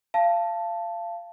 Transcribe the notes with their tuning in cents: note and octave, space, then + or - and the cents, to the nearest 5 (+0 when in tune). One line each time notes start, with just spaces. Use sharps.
F5 -25 A5 +0